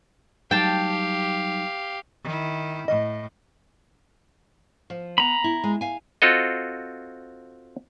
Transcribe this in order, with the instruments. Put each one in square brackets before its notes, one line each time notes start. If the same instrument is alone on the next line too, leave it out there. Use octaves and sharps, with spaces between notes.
[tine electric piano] F#3 G3 D#4 [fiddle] G4 F5 [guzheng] G5 A5
[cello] D#3 E4
[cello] A2 [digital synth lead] D#5
[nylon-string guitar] F3
[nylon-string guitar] B3 [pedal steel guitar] A#5 B5
[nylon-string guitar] E4
G#3
F5 G#5
[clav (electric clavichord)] C4 F4 F#4 A4 D#5